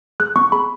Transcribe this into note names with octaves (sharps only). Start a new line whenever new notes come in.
G#4 F#6
B3 C#6
G#4 B5